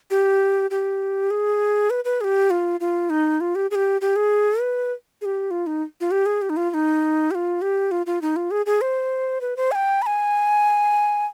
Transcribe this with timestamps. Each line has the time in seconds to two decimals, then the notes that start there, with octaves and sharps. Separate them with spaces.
0.11 G4
0.71 G4
1.31 G#4
1.90 B4
2.05 B4
2.21 G#4
2.24 G4
2.51 F4
2.80 F4
3.10 D#4
3.41 F4
3.55 G4
3.71 G#4
3.75 G4
4.01 G4
4.16 G#4
4.61 B4
5.21 G#4
5.25 G4
5.51 F4
5.67 D#4
6.01 F4
6.11 G4
6.26 G#4
6.42 G4
6.50 D#4
6.57 F4
6.71 F4
6.74 D#4
7.31 G4
7.35 F4
7.62 G4
7.91 F4
8.06 F4
8.22 D#4
8.36 F4
8.51 G#4
8.66 G#4
8.81 C5
9.41 B4
9.57 C5
9.72 G#5
9.75 G5
10.02 B5
10.06 G#5